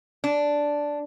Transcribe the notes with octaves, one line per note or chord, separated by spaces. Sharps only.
D4